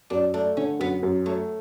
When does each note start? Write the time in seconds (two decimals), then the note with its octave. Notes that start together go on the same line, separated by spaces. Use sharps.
0.10 F#2 D4
0.34 A3 D4
0.57 D3 C#4
0.80 F#2 B3
1.03 F#2
1.26 F#3 A3